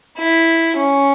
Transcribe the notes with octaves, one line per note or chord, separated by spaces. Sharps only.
E4
C#4